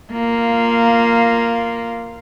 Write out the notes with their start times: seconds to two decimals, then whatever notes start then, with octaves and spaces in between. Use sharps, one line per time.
0.13 A#3 F4